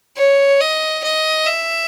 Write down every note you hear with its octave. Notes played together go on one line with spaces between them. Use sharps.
C#5
D#5
D#5
E5